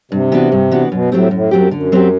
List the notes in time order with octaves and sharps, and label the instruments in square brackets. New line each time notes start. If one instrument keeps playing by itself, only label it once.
[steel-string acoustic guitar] G2 [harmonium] C3
[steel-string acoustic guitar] E3 B3 D4 F#4
G2
E3 B3 D4 F#4
[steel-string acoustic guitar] F#2 [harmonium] B2
[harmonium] A2 [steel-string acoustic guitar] F#3 A3 C4 G4
[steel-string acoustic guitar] F#2 [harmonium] A2
[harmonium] F#2 [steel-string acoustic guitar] F#3 A3 C4 G4
[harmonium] F#2 [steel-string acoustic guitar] D3
[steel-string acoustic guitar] F#3 C4 G4